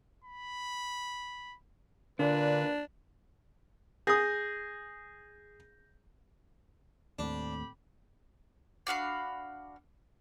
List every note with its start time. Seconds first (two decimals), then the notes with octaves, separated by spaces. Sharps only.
0.24 B5
2.19 A#2 D3 D4 B4
4.07 G#4 D#6 G6 A#6
7.19 D#2 A2 C4 D4 G4 B5
8.87 D4 F#4 F5 B5